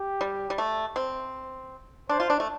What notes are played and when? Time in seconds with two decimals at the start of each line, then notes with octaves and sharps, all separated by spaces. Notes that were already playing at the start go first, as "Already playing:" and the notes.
Already playing: G4
0.21 G3
0.50 G3
0.58 A3
0.96 C4
2.09 D4 C5
2.20 F4
2.30 D4
2.40 A3